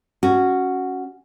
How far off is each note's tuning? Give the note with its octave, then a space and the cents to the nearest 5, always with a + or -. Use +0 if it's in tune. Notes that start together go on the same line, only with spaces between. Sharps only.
C#4 +0 F#4 +0